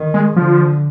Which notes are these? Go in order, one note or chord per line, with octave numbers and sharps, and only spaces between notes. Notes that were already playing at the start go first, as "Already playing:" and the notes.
Already playing: D#3
G#3
D3 F3